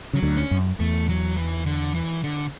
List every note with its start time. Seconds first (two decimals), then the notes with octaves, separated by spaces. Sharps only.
0.13 C#3 F#3
0.22 D2 D3
0.37 C#4
0.51 F#2
0.80 E2 A3
1.09 F#3
1.37 E3
1.66 D3
1.95 E3
2.24 D3